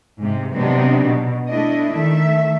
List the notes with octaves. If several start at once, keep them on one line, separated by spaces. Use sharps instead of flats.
G#2 C3
C3 F#3 B3 D4 D#4
B2
A3 D4 E4 D#5
D#3 A3 E5